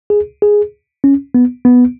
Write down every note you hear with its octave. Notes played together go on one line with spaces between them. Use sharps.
G#4
G#4
C#4
B3
B3